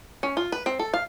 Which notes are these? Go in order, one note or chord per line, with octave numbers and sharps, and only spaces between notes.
C#4
F4
B4
C4
A4
F5